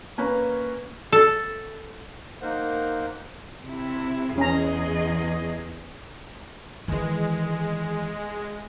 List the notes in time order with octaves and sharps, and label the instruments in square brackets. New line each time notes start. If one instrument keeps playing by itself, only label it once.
[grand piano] A#3 C#4 B4
[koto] A4
[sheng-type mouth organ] A#3 D#4 A#4 C5 F#5
[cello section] C3 E4
[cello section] E2 G#4 D#5 [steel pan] C#4 A#5
[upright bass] D#3 E3 [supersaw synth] G#3